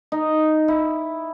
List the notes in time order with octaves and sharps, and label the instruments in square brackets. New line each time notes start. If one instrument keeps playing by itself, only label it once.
[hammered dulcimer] D#4
E4